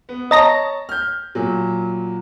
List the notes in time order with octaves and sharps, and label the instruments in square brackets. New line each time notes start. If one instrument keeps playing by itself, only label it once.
[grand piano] B3
[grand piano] C#5 A5 [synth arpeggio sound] D#5 A#5 A#6
[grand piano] F6 G6
A#2 F#3